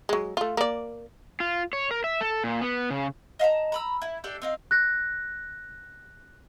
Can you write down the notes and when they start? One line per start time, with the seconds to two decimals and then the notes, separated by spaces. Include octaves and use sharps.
0.09 F#3 G#3
0.37 A3 F4
0.57 A#3 D5
1.40 F4
1.73 C#5
1.91 A#4
2.04 E5
2.21 A4
2.44 A#2
2.61 B3
2.90 C#3
3.39 D#5 F5 A5 A#5
3.72 A#5 B5 E6
4.02 E4
4.24 D4 G4 A4 D5
4.42 C4 D#4 F5
4.71 F#6 A#6